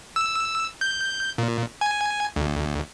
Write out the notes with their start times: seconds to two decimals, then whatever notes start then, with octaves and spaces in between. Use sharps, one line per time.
0.16 E6
0.81 G6
1.38 A#2
1.81 G#5
2.36 D2